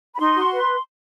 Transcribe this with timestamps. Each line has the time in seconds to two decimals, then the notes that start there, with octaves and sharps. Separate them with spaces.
0.15 B5
0.18 D#4 C6
0.35 F#4
0.53 B4